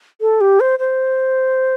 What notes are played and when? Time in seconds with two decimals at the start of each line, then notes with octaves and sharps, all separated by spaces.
0.21 A4
0.41 G4
0.60 C5
0.79 C5